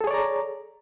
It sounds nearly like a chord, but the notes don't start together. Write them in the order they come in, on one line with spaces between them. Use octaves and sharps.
A4 G#4 C#5 D5 A#5